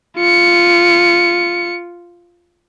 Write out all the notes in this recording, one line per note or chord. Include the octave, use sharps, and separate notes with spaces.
F4 C#7